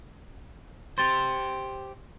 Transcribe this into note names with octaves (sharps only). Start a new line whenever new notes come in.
G4 C5 C6 A6